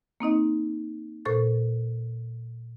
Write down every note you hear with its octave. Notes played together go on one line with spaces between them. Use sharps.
A#3 C4 D#4 D#5
A#2 A4 C5 C#6 A6